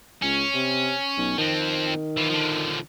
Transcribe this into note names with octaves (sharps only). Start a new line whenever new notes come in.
C#2 C#4
C3
B1
D#3 F3 C4
E3 F4
D3 F3